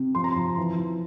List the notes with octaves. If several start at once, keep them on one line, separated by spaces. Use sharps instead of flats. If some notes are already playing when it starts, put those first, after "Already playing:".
Already playing: C3
F3 C6
A#5
C6
F3
E3
E3